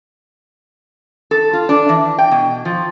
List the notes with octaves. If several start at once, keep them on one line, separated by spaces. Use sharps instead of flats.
A4
F4
D4
E3
G5
B2
F3